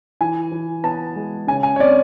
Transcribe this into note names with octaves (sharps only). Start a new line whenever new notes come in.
E3 G#5
E3
B3 A5
G#3
C#3 G#5
G#5
C#5
C4 D5